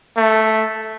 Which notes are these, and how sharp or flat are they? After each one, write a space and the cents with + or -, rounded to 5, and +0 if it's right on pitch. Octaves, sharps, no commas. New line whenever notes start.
A3 -5